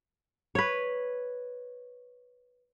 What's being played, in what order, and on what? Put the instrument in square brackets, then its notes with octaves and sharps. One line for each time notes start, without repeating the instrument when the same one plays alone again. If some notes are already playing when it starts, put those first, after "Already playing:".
[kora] B4 C#5